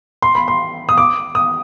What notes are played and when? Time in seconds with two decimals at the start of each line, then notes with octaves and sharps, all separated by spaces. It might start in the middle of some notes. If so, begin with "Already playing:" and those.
0.22 C6
0.35 B5
0.48 C6
0.89 D#6
0.97 D6
1.35 D#6